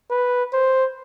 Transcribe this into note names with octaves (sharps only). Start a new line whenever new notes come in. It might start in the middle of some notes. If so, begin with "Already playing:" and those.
B4
C5